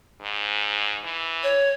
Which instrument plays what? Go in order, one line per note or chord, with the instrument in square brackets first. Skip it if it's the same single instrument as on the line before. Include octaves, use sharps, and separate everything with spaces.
[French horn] G#2
E3
[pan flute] C#5